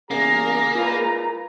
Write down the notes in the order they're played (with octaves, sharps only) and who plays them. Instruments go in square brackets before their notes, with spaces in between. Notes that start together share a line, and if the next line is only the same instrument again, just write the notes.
[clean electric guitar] E2 C#3 [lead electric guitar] A#3 [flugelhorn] G#4 [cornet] A#5
[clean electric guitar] F4 A#4 B4